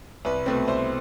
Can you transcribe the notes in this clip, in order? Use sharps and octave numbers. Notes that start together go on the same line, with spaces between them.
C2 B4
B2 A3 C4 B4
C2 C5